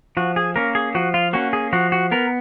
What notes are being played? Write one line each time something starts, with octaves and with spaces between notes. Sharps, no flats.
F3 F#4
G#4
A#3 C#4 A#4
G#4
F3 F#4
F4
A#3 C#4 F#4
G#4
F3 F#4
F#4
B3 A#4